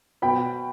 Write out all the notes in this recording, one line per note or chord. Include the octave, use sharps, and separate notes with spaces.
B2 G5 B5